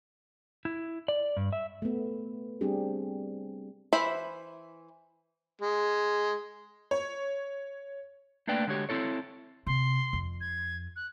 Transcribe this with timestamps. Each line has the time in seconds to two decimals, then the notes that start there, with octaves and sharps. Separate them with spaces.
0.65 E4
1.08 D5
1.37 G2
1.53 E5
1.82 A3 B3
2.61 G3 C4 D4 G4 G#4
3.93 E3 C5 E5 B5
5.61 G#3
6.91 C#5
8.47 A3 A#3 D4 B4 D5 G5
8.67 D3 G#3 F#4 G4 C#5
8.89 C4 E4 A4 C#5
9.67 C3 C6
10.13 F2
10.41 G#6
10.96 F#6